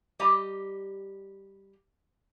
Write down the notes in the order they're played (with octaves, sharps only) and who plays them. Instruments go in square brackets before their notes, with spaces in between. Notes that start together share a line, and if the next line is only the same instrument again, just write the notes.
[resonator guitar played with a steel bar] G3 G4 D#5 A#5